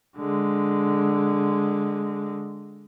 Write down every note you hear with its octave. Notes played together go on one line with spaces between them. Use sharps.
D3 G#3